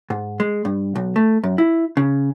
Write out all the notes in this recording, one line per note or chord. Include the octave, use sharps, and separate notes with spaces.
G#2
G#3
G2
B1
A3
F#2
E4
C#3